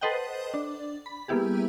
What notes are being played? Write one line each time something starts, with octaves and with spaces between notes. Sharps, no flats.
A4 B4 C5 D#5 F#5 G5
D4
B5
G3 A#3 B3 E4 G4 G#4